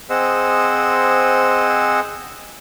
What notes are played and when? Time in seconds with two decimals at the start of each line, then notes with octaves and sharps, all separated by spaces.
0.10 C4 G#4 C5 D#5 F#5 E6